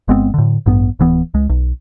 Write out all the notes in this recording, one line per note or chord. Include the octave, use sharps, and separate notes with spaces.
G1 G#3 B3 C4
A2 D3
A1 G2 B3
D1 E3 B3
C#2 G#3
B1